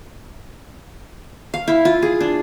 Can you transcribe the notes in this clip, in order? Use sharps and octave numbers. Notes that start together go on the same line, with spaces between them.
F5
E4
F4
G#4
D4